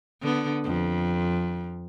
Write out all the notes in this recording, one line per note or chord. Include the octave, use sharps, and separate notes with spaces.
D3 B3
F2